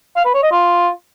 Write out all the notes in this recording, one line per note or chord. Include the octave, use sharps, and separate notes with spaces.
F5
B4
C#5
D#5
F4